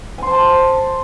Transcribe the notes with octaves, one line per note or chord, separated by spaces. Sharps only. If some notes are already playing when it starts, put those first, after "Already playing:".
C5 G#5 A5 C6